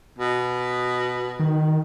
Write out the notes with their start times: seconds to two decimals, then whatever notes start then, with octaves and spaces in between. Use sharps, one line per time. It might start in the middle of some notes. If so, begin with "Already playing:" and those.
0.19 B2
1.40 D#3